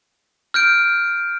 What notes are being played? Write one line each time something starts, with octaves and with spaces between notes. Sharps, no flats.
F6 G6 D7